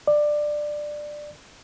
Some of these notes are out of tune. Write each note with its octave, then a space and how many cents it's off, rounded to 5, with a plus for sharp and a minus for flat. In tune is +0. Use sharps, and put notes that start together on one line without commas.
D5 +15